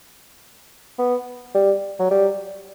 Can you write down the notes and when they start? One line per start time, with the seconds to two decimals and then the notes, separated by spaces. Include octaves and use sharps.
0.99 B3
1.55 G3
2.00 F#3
2.11 G3